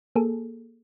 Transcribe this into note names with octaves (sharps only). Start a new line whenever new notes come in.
A#3 G#4 A4